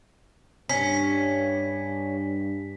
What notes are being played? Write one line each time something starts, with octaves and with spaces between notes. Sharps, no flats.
G2 C#4 B6